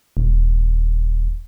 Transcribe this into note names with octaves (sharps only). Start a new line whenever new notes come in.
D#1